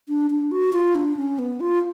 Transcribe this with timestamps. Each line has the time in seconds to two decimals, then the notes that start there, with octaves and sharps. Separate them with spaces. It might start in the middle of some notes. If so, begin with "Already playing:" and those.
0.09 D4
0.30 D4
0.51 F#4
0.73 F4
0.95 D4
1.17 C#4
1.39 B3
1.60 F4